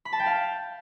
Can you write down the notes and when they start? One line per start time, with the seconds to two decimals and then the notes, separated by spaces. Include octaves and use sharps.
0.05 B5
0.13 A5
0.19 G5
0.26 F5